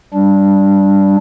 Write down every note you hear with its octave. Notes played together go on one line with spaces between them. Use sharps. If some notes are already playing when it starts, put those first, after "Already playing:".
G3 D4